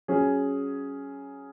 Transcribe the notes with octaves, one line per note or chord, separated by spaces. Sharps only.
F#3 C#4 G#4